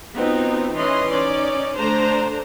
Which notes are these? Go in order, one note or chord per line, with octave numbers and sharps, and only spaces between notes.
B3 C4 D#4 F4 F#4
E3 C#4 D#5 C6
C#4 D#4 D5
D3 A3 D4 C5 A#5